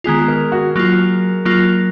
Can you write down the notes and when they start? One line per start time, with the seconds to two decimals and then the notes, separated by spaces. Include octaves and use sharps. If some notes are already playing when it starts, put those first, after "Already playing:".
0.04 D#3 G#3 B3 F4 G#4
0.19 G#4
0.28 A#4
0.52 F#4
0.76 F#3 A#3 F4
1.45 F#3 A#3 F4